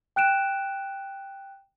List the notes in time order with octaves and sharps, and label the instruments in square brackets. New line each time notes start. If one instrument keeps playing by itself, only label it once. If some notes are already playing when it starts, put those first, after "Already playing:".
[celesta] G5 F#6 D7 E7